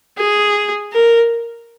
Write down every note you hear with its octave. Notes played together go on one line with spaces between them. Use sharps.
G#4
A#4